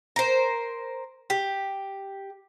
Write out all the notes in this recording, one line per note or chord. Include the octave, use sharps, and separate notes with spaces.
A#4 C5
G4